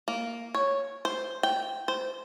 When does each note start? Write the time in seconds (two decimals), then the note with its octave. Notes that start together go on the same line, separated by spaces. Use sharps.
0.08 A#3
0.54 C#5
1.05 C5
1.43 G5
1.88 C5